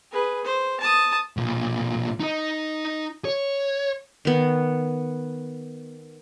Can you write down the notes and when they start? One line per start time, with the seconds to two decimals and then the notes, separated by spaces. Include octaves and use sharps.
0.12 G#4 B4
0.44 C5
0.80 A5 D#6
1.37 B1 A#2
2.20 D#4 D#5
3.25 C#5
4.25 D#3 B3